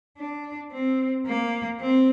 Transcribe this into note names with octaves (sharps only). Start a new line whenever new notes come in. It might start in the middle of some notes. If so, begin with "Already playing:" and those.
D4
C4
A#3
C4